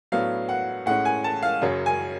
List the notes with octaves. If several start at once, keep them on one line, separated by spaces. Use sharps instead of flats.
A2 F#3 B3 D4 F5
F#5
A2 G#3 C#4 F#5
G#5
A5
F5
F#2 C#3 F#3 C#4
G#5